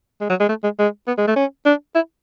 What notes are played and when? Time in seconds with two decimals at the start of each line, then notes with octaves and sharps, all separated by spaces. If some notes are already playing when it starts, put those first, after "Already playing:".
0.21 G#3
0.30 F#3
0.40 G#3
0.49 A3
0.63 G#3
0.79 G#3
1.07 B3
1.18 G#3
1.27 A3
1.36 C#4
1.65 D4
1.95 E4